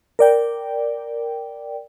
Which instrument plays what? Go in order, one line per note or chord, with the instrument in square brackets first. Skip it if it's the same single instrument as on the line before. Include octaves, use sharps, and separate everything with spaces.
[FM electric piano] A#4 D5 G5